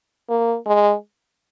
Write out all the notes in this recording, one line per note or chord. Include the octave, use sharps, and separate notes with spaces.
A#3
G#3